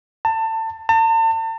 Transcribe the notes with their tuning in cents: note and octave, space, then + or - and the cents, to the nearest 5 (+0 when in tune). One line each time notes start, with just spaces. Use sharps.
A5 +25
A5 +40